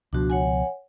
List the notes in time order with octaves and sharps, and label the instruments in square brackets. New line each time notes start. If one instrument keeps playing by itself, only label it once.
[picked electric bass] C#2 B2 F3 [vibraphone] D4 F#4
[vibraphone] C#5 F#5 G#5